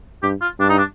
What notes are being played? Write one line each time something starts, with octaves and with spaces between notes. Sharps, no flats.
G2 G4
F4
G2 D4
D#4
D4